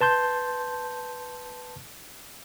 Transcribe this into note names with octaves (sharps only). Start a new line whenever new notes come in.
B4 A5 C6 G6